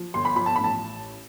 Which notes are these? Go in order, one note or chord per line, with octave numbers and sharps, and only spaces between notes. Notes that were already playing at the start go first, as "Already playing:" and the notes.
Already playing: F3
G1 C6
B5
F3 B5
A5
A1 B5
A5